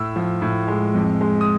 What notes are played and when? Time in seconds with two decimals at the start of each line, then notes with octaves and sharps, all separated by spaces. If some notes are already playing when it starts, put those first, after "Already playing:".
Already playing: A2 E6
0.16 F3
0.42 A2
0.68 G#3
0.94 F2
1.21 G#3
1.41 D#6